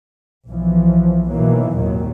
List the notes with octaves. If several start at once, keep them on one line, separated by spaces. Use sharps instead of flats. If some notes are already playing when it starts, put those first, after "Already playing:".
B1 E3 F3
B2 D#3 E3 F#3 A#3
G#1 D#2 A#2 D#3 F#3